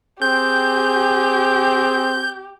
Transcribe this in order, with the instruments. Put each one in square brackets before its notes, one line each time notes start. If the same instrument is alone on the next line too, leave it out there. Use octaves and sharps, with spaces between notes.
[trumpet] C4 [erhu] G4 [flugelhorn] G#4 [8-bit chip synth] G6